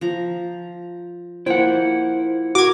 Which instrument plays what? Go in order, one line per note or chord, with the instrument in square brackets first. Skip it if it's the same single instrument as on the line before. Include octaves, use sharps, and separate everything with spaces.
[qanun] F3 A#5
[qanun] F3 A#3 G5 [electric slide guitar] E4 F#5 [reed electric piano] C5
[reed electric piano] F#4 [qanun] A#4 [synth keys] D6 G#6